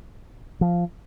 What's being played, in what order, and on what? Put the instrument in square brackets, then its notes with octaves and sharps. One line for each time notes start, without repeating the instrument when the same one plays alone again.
[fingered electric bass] F3